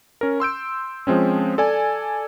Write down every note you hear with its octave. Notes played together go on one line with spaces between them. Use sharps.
C#4 A#4
C6 E6 G6 D7
F3 G#3 C4 C#4
A4 D5 G#5